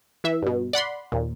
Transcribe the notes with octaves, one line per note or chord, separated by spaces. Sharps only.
E3 E5
G2 B2
D5 F#5 B5 C6
D#2 A#2